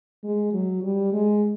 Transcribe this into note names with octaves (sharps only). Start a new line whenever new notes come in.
G#3
F#3
G3
G#3